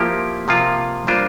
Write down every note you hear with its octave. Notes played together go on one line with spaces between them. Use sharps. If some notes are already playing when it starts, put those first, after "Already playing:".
Already playing: F3 A#3 E4 G4
C3 F3 A#3 F4
G3 A#3 D4 F4 C5